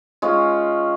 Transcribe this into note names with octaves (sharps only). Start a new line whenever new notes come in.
G#3 C#4 F4